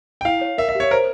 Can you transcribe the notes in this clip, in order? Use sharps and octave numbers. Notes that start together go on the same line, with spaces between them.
G5
E4 F5
C#5
A#4 E5
E5
G4 C#5
A#4 C5